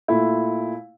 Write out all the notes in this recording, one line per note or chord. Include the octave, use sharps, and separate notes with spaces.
A#2 A3 E4